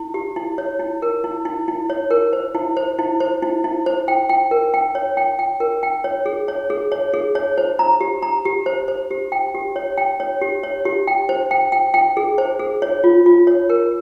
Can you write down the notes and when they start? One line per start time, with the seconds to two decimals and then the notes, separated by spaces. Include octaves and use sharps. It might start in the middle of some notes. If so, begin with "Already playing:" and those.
Already playing: E4
0.14 G4
0.36 E4
0.58 C#5
0.79 E4
1.02 A#4
1.24 E4
1.45 E4
1.68 E4
1.90 C#5
2.11 A#4
2.33 C5
2.55 E4
2.77 C5
2.99 E4
3.20 C5
3.42 E4
3.64 E4
3.86 C5
4.08 G5
4.29 G5
4.51 A#4
4.74 G5
4.95 C#5
5.17 G5
5.39 G5
5.60 A#4
5.83 G5
6.04 C#5
6.26 G#4
6.48 C#5
6.70 G#4
6.92 C#5
7.14 G#4
7.35 C#5
7.58 C5
7.79 A#5
8.01 G4
8.23 A#5
8.45 G4
8.66 C5
8.88 C5
9.11 G4
9.32 G5
9.55 G4
9.76 C#5
9.97 G5
10.20 C#5
10.42 G4
10.63 C#5
10.85 G4
11.07 G5
11.29 C5
11.51 G5
11.72 G5
11.94 G5
12.17 G#4
12.38 C5
12.60 G#4
12.82 C#5
13.04 F4
13.26 F4
13.47 C#5
13.70 A#4